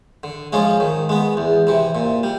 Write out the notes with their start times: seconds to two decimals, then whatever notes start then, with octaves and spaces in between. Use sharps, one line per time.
0.23 D3
0.53 F3 G#3 C#4 F4
0.80 D#3
1.09 G#3 B3
1.37 E2
1.67 C3 E3
1.95 A#2
2.23 G3